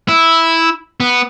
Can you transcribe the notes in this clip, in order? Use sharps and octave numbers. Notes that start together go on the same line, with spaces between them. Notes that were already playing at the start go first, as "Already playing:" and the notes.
E4
B3